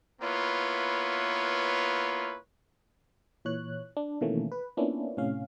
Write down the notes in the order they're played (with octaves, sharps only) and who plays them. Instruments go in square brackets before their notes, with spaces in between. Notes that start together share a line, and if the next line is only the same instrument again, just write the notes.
[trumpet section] A#3 B3 E4 F4 B4 C#5
[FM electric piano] A#2 E3 C#5 F#6
D4
B2 D#3 E3 A3 A#3 C#4
B4
A#3 B3 C#4 D4 E4 F4
A2 C3 C#4 F5